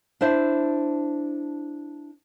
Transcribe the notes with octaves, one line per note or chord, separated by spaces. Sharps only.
D4 E4 C5 E5